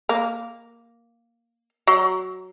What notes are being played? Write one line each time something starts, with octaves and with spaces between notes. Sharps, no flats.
A#3
F#3